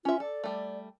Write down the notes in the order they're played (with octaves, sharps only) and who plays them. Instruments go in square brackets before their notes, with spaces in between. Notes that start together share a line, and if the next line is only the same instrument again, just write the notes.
[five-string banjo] C#4 E5 [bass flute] F4
[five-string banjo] A4 [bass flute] D5
[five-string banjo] G3 A3